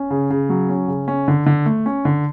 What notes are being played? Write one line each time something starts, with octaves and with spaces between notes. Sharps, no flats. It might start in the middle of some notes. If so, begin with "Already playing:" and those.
Already playing: C#4
C#3
C#3
F#3
C#4
C#3
C#4
D3
D3
A3
C#4
D3